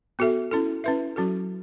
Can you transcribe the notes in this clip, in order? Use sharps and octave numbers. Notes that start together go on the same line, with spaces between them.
B3 F#4 A4 E5
C#4 E4 A4
C#4 E4 B4 E5
F#3 C#4 F#4 A4